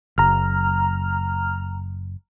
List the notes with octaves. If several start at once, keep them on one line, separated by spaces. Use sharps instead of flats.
F#1 A#5 F6